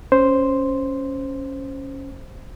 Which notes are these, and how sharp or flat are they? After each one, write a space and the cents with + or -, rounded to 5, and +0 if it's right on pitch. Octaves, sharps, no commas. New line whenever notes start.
C#4 -5 C5 +0